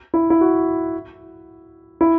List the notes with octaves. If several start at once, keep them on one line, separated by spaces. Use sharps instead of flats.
E4
E4
F#4
E4